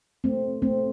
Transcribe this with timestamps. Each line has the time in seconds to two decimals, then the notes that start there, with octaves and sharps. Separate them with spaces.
0.24 A3 C4
0.62 A3 C4